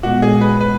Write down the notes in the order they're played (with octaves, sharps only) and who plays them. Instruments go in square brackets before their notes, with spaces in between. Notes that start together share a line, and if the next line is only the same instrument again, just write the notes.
[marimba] A#2 G#3 B3 [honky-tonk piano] F#4
[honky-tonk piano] G#4
B4
B4